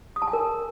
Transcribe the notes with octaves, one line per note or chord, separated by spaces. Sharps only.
D#6
A5
G#5
A#4